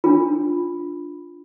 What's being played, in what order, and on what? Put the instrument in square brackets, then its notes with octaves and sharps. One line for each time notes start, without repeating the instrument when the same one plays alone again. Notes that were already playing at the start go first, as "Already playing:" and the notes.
[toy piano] D4 F4